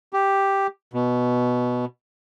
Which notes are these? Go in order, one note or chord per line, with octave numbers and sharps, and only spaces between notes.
G4
B2